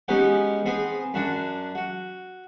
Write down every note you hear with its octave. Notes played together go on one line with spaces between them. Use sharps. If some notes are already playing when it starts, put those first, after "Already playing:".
G#3 B3 C#4 D#4 F#4 G4
B3 C4 G#4
F#2 D4 F#4
F#4